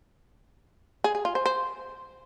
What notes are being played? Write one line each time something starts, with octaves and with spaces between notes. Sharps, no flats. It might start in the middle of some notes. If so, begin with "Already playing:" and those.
G#4
G#4
F4
C5
C5